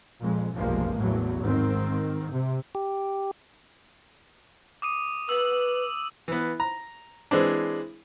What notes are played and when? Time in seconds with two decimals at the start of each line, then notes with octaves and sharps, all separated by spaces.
0.22 F2 A#2 G#3
0.56 F1 B1 G2 F3 G#3 A#3
0.98 A1 E2 A2 F#3
1.44 G#2 D#3 C4
2.32 C3
2.75 G4
4.82 D6 D#6 D#7
5.29 B4 E6 F#7
6.28 E3 B3
6.60 A#5
7.31 E3 G#3 C4 D4